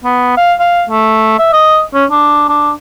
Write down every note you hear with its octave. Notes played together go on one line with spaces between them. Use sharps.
B3
F5
F5
A3
E5
D#5
C#4
D4
D4